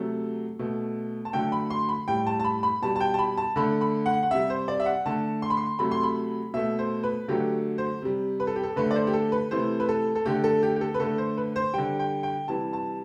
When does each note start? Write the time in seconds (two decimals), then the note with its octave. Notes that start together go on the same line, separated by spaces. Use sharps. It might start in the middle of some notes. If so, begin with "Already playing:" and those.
Already playing: C3 F#3 A3
0.59 B2 A3
1.25 A5
1.33 D3 F#3 A3 G5
1.52 B5
1.70 C6
1.89 B5
2.08 A2 G3 G5
2.27 A5
2.40 A5
2.45 B5
2.63 B5
2.82 B2 G3 A5
2.96 A5
3.00 G5
3.14 A5
3.19 B5
3.37 A5
3.56 D3 A3 B5
3.81 B5
4.06 F#5
4.23 F#5
4.31 C3 G3 E5
4.50 C5
4.68 D5
4.80 E5
4.86 F#5
5.06 D3 A3 A5
5.42 C6
5.50 B5
5.57 C6
5.79 C3 F#3 A3 B5
5.92 C6
6.03 B5
6.54 B2 A3 E5
6.79 C5
7.03 B4
7.28 D3 F#3 A3 G4
7.78 C5
8.02 C3 G3
8.40 B4
8.47 A4
8.56 G4
8.63 A4
8.76 D3 A3 B4
8.91 D5
8.96 C5
9.07 G4
9.13 A4
9.32 B4
9.51 C3 E3 A3 C5
9.80 B4
9.89 A4
10.15 A4
10.25 D3 A3 G4
10.44 A4
10.63 G4
10.76 G4
10.81 A4
10.94 B4
11.00 D3 A3 A4
11.18 C5
11.37 B4
11.56 C5
11.74 D3 G3 G5
11.99 G5
12.23 G5
12.48 C3 E3 G3 A5
12.73 A5